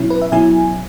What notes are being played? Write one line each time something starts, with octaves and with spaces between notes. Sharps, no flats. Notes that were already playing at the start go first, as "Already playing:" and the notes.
Already playing: B2 F#3 C#4 E4
B4
E5
B2 F#3 C#4 E4 G#5